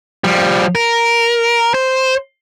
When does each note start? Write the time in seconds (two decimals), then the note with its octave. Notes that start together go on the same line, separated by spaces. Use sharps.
0.24 F3 G3
0.75 A#4
1.74 C5